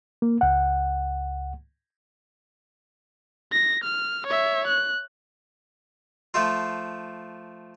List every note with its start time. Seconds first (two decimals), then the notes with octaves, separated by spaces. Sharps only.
0.22 A#3
0.41 C#2 F#5
3.52 A#6
3.84 F6
4.27 C#5 E5
4.67 F#6
6.34 F3 A3 F4